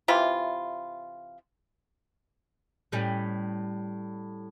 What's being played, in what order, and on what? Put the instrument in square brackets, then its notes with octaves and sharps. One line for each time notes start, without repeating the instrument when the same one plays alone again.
[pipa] C3 E3 F4 B5
[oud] A2 G3 C#4